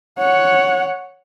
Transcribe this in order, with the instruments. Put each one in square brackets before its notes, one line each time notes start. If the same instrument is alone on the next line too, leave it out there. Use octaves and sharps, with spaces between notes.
[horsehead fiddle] C#5 F#5